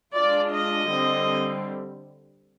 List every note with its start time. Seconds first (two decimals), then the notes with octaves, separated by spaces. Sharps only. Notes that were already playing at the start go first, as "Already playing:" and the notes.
0.14 G#3 D4 F4 D5
0.51 D#5
0.88 D3 G3 C4